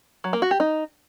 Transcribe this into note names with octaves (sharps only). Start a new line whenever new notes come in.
F#3
A#3
F#4
G4
D#4